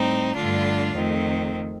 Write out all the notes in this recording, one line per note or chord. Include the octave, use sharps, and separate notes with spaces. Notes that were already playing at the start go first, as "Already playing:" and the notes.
Already playing: A2 G3 C4 D#4
G2 D3 A3 D4 F4
F2 D#3 A3 C4